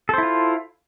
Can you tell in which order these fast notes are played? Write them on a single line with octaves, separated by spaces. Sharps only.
A4 C5 E4 F4